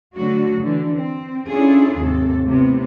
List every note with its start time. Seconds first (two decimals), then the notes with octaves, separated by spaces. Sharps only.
0.14 D3 F#3 A3 F#4
0.60 D3 E3
0.96 C4
1.48 C#4 D4 E4 F4 G#4 A4
1.98 D#2 G#2 C3 C4 A4
2.44 A2 C3 B3